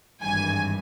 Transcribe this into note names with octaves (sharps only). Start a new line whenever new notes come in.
G#1 G2 E3 G#5